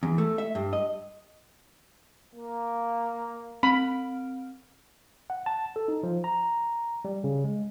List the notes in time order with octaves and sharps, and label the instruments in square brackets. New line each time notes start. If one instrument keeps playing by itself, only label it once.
[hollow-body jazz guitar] E2
A3
E5
G2
D#5
[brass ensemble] A#3
[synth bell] C4 [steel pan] B5
[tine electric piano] F#5
A5
A4
D#4
F3
A#5
G3
C#3
G#3